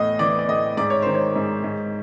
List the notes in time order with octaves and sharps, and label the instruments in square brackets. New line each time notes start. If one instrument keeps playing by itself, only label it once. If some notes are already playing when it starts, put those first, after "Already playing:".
Already playing: [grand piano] E2 A2 D#5
E3 D5
D5
A2 D#5
G#2 D5
C#5
D#3 C5
C#5
G#2
G#2